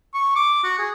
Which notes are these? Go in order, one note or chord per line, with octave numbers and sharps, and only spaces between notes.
C#6
D6
F#4
G#4